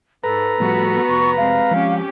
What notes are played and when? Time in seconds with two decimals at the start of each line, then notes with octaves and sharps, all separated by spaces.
0.24 G#2 A4 B4 A#5
0.60 A2 F3 G3 B3 F#4
1.09 F1 C#6
1.37 C3 G#3 F5
1.71 F3 G#3 C#4 G4